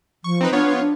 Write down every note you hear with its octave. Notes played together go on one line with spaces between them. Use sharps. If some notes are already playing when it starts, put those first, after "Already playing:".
F3 C#6
C4 D#4 B4
B3 D4 F4 C#5
D4